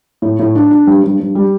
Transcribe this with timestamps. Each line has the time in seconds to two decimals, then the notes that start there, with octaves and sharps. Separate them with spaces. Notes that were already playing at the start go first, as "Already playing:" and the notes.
0.22 A2
0.39 A2
0.55 D4
0.71 D4
0.87 G2
1.04 G2
1.20 G2
1.35 G3